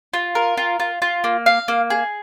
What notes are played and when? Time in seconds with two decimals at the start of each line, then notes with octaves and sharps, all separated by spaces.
0.13 F4
0.35 A#4
0.57 F4
0.80 F4
1.02 F4
1.24 A#3
1.46 F5
1.68 A#3
1.90 G#4